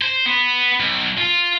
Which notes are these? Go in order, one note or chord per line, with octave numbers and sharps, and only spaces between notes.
C5
B3
B1
F4